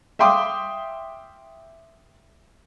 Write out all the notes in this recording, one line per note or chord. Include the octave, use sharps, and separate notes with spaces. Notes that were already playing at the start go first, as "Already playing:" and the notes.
E5 F5 G5 C6 D6 D#6